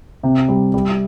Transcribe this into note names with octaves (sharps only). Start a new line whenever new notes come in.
C3
G3
G3